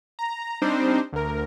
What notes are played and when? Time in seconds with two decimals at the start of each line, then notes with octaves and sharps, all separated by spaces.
0.19 A#5
0.62 G3 C4 D4 D#4 C5
1.13 D2 A#4